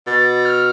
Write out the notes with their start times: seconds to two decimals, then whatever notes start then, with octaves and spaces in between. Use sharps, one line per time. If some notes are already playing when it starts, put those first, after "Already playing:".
0.07 B2 A6
0.45 F6